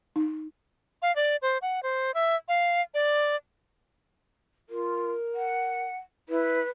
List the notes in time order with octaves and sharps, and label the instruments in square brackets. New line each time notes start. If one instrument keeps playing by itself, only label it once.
[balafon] D#4
[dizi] F5
D5
C5
F#5
C5
E5
F5
D5
[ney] F4 [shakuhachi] A#4
[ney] F#5
[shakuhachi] E4 [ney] B4